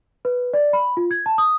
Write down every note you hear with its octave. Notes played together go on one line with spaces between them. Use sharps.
B4
D5
B5
F4
G#6
A5
D#6